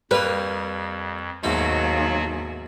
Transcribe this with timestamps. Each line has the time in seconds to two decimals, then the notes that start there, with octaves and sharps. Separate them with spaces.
0.11 F2 G3 A#3 A#4 B4
1.44 D#2 G#2 B2 F#3 A3 F#4